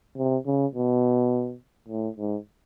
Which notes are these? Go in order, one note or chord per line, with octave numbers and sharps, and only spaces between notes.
C3
C#3
B2
A2
G#2